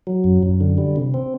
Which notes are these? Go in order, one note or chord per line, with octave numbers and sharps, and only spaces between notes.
F#3
F#2
F#2
D3
G3
C3
C4